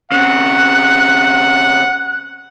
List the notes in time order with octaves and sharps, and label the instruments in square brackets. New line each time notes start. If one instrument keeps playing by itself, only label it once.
[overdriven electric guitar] C#3 C4 [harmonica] F#5 [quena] F#6